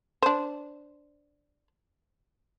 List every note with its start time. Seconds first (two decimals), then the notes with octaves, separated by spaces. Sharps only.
0.22 D4 C5